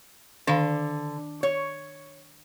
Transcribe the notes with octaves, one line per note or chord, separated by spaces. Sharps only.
D3 D#3 F5 B5
C#5